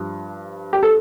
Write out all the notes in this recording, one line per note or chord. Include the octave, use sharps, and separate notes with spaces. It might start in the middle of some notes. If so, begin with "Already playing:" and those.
Already playing: G2 F3
G4
A4